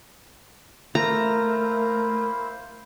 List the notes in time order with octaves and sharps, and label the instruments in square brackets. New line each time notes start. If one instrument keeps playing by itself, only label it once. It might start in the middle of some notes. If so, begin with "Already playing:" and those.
[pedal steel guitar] A3 [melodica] A#3 E4 C5 [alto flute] A#4 [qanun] A#5